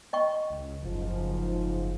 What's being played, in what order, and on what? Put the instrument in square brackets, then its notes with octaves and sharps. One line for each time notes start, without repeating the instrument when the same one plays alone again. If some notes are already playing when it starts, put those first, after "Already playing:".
[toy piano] D#5 G5 C#6
[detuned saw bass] C#2
[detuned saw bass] F#1 [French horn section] G#2 F3